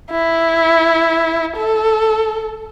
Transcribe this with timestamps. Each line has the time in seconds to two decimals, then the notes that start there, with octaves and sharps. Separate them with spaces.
0.11 E4
1.56 A4